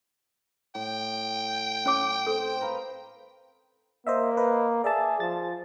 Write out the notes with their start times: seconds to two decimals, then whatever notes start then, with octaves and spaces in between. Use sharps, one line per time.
0.75 A2 G5
1.86 C#4 C#5 D6
2.27 C4 A4 C5
2.61 A#4 B4 F5
4.07 A#3 C5 D#5 E5
4.37 B4 D#5
4.84 G#4 D5 E5 A5
5.20 F3 A6